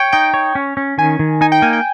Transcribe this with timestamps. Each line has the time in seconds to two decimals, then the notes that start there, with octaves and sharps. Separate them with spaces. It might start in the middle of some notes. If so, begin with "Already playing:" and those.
Already playing: C#5 G5
0.13 D#4 G5
0.34 C#5
0.55 C#4
0.77 C#4
0.98 D#3 G#5
1.19 D#3
1.41 D#4 G#5
1.52 G5
1.62 A#3 G#5
1.73 G5